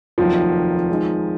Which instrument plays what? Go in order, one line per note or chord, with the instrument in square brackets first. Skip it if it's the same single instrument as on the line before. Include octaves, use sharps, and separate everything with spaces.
[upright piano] F1 D#2 D#3 F#3 [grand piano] F3
[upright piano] D#3 G#3 D#4